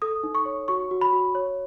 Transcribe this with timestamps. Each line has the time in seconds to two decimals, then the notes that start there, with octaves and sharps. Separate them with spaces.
0.02 A4 D#6
0.23 D#4
0.35 C#6
0.45 C#5
0.68 F#4 C#6
0.91 F#4
1.01 B5
1.13 F#4
1.35 C#5